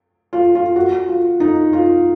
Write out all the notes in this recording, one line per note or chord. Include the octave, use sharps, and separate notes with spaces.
F4
F4
F#4
F4
D#4
F4